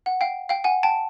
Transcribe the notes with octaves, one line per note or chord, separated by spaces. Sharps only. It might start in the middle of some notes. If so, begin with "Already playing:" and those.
F#5
F5 G5
F5 G5
F#5 G#5
G5 A5